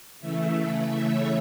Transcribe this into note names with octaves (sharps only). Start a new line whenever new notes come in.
C#3 E3 A3 E5
E5
C#5